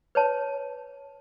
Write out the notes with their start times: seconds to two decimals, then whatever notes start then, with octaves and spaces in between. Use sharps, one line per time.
0.15 B4 C#5 A5